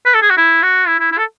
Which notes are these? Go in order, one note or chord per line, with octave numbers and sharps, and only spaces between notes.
B4
A4
G#4
F#4
E4
F#4
E4
E4
E4
A4